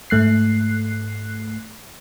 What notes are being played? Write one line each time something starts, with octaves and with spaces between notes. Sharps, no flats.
G#2 A3 F#6 C7